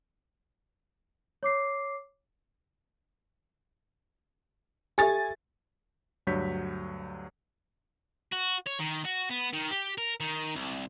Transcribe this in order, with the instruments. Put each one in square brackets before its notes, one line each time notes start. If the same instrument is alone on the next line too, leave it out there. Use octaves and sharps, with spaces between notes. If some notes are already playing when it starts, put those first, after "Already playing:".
[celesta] C#5 D6 C7
[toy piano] G4 A4 E5 [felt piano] G#5 A6
[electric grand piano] D2 G2 F#3 C#5 G6 B6
[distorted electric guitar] F#4
C#5
D#3
F#4
B3
D#3
G4
A#4
D#3
C2